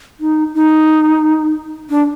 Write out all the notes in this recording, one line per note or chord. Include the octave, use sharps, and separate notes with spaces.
D#4
D#4
D4